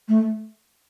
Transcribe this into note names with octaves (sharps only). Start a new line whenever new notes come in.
A3